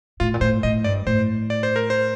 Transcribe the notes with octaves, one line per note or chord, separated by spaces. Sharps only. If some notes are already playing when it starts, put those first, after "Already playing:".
A2 F4
A#2
A2 C5
A2 D#5
G2 D5
A2 C5
D5
C5
A#4
C5